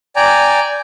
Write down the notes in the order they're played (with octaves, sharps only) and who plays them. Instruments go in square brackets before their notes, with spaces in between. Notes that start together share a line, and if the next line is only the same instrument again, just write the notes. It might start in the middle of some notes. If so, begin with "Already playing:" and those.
[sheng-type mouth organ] D5 G5 G#5 A#5